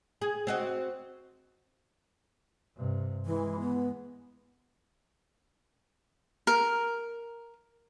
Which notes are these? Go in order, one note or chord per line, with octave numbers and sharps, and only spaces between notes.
G#4
C4 F#4 D#5
G2 C3
E3 G#3
B3
A#4